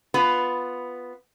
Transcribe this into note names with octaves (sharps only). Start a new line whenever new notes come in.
B3 F4 B4